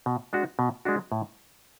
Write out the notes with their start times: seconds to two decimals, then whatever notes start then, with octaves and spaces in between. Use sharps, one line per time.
0.06 B2
0.33 G#3 D4 F#4
0.59 B2
0.85 G#3 D4 F#4
1.12 A2